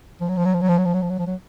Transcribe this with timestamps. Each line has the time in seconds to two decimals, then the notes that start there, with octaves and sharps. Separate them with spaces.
0.21 F3
0.29 F#3
0.37 F3
0.45 F#3
0.54 F3
0.61 F#3
0.69 F3
0.78 F#3
0.85 F3
0.94 F#3
1.02 F3
1.10 F#3
1.19 F3
1.27 F#3